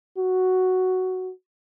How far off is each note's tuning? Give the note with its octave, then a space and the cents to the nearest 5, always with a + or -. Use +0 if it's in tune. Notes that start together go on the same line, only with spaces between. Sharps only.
F#4 +5